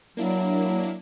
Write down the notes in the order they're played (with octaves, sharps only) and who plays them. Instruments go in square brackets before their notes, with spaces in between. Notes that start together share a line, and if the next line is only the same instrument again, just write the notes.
[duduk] F#3 [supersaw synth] A#3 D4 E4